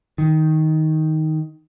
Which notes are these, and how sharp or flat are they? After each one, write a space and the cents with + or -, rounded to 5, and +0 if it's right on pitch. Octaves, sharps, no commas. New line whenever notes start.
D#3 +10